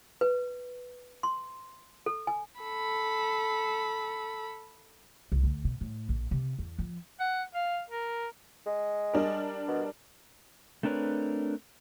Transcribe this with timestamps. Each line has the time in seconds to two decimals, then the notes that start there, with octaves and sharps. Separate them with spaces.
0.21 B4
1.23 C6
2.06 A4
2.27 G#5
2.61 A4 B5
5.32 C2
5.43 D2
5.64 B2
5.81 A2
6.09 A#1
6.31 C3
6.59 E2
6.79 F3
7.20 F#5
7.55 F5
7.90 A#4
8.66 G#3
9.14 G3 D4 A#4
9.68 B2
10.83 A3 C4 D4 A#4 B4 C#5